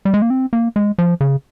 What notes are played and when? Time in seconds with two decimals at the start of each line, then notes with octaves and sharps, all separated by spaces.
0.05 G3
0.14 G#3
0.22 A#3
0.30 C4
0.53 A#3
0.76 G#3
0.98 F3
1.21 C#3